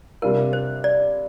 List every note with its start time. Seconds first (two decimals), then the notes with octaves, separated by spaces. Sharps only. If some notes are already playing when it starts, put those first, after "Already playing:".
0.22 C3 G3 D4 F4 A#4
0.53 C5
0.84 D5